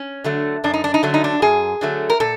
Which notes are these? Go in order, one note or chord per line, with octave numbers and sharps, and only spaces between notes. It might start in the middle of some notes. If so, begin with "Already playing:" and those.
Already playing: C#4
D3 F#3 A3
F#2 D4
D#4
D4
D#4
D3 F#3 A3 D4
D#4
D4
F#2 G#4
D3 F#3 A3
A#4
A#2 A4